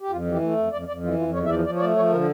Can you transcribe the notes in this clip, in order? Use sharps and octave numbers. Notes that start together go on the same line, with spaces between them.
G4
F2 F4
E3 G4
A3
F2
F2 D5
F2 D5
E3 F4
F2 F4
E2 C#5
E5
F3 D5
F3 D5
C#5
A3 D5
F3 C#5
D3 A#4